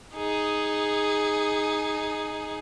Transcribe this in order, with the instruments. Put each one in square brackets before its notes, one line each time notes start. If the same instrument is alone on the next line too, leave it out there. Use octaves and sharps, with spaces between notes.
[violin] D#4 G#4